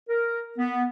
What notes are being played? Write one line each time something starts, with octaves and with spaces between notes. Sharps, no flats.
A#4
B3